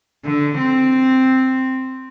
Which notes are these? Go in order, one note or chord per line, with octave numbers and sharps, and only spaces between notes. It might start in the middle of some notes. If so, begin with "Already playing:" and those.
D3
C4